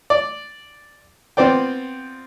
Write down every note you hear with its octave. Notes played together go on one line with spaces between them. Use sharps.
D5
B3 C4 F4 C5 D5 G5